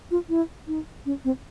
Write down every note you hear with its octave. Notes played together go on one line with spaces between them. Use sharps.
F4
E4
D#4
C#4
C4